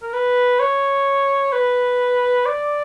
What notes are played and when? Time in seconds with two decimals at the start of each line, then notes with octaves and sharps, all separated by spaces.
0.02 A#4
0.13 B4
0.60 C#5
1.53 B4
2.46 D5